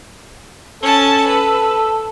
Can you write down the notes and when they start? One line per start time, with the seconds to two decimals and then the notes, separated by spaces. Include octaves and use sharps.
0.83 C#4 A4 A5
1.27 B4